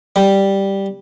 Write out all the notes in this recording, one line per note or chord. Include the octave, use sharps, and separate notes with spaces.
G3